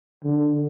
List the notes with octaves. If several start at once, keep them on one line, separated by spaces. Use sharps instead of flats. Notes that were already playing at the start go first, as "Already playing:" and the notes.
D3